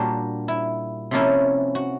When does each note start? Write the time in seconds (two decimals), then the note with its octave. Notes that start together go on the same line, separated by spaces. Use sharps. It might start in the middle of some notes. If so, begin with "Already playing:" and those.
Already playing: A#2 G3 A#3 D4 F#4
0.48 E4
1.11 C3 F3 A#3 C#4 E4
1.75 F#4